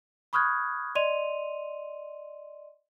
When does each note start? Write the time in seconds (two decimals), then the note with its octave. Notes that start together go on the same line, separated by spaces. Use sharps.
0.33 B5 C#6 D#6 F6 F#6 G#6
0.95 D5 D#5 C6 D#7 F7